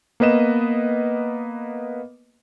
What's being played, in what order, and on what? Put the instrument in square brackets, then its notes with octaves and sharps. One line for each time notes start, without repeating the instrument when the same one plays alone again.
[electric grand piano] A#3 B3 B4 D#5 E7